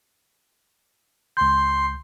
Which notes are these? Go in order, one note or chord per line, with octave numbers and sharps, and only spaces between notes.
C#2 C6 G6